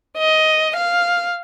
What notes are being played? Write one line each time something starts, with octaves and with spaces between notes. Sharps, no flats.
D#5
F5